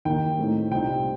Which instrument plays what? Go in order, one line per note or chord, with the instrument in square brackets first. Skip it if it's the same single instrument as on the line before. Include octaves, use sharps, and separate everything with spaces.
[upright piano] D#2 D#3 A#3 D#4 G5
A2 A3 C4 D#4
C2 A#2 G3 C4 D#4 G5